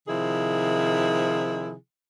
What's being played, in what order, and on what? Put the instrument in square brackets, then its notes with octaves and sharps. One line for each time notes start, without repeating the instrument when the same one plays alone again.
[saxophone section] C3 D#3 F3 E4 G#4